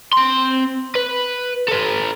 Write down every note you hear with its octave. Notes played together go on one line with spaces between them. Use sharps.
C4 C6
B4
A4 B4